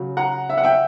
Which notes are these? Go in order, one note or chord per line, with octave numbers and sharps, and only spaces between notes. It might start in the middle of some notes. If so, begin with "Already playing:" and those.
Already playing: C#3 F#3
F#5 A#5
E5
F#5
E5 G5